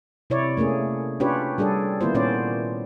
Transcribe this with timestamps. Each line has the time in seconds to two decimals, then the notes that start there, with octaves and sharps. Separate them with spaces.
0.30 C3 E4 C#5 D5
0.57 A3 A#3 C#4 G#4
1.20 C#4 D4 F4 G4 B4 C#5
1.58 G3 D4 G#4 A4 D5
2.01 D#3 A#3 B3 E4 F4 C5
2.14 A#2 B3 C#4 C5 D5